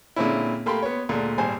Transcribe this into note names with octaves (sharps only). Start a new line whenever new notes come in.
A#2 D3 G#3 C4 C#4 E4
A3 A#3 G4 B5 C6
B3 C#5
D2 A#2 G#3 A3
G#1 G3 C5 G#5